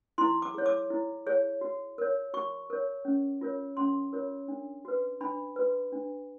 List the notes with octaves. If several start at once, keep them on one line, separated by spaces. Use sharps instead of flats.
E4 C6
D6
G#4 C#5
D6
E4
G#4 C#5
F#4
A#4 C#5
F#4 C#6
A#4 C#5
C#4
F4 A#4 C#5
C#4 C6
F4 A#4 C#5
D4
F#4 B4
D4 B5
F#4 B4
D4